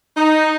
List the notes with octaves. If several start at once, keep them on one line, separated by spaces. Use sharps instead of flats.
D#4